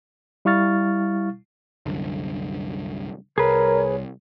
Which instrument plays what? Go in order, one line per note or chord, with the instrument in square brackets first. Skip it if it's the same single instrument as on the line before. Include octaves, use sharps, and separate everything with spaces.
[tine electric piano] G3 E4 F5 C#6 F6 A6
[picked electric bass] C2 F#2 D3
[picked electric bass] C2 [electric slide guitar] G#4 B4 [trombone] A#4 [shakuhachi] C#5